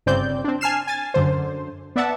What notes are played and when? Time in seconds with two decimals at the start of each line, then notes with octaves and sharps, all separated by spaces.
0.06 G1 C#3 C4 D5 G6
0.44 C4 D4
0.61 G#5 A5 F6 C7 E7
0.87 G#5 A6
1.14 F#2 D3 C5
1.96 B3 D5 E5 F#5 A5